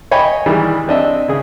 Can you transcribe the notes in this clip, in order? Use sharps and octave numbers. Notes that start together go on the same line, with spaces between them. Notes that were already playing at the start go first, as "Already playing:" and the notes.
C#5 D#5 G5 G#5 B5
D#3 E3 G3 G#3
C4 D4 D#5 E5
C#3 G#4